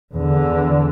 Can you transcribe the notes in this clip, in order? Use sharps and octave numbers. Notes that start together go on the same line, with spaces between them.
E2 D3